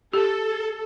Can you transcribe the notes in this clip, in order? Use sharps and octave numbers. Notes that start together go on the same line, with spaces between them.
G4 A4